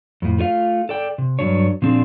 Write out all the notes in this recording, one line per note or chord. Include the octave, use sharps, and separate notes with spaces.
F2 A2
A3 F4 C#5 F5
A4 D5 G5
C3
G2 F3 F#3 D4 C#5
A#2 F3 C4 D4 G#4